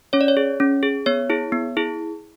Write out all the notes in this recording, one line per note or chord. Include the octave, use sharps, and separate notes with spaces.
C#4 C#5
D5
C#5
G#4
C#4
G#4
B3 C#5
E4 G#4
B3
E4 G#4